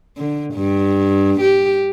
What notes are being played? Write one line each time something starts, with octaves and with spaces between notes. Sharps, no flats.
D3
G2
G4